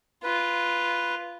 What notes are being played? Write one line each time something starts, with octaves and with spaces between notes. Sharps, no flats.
F4 B4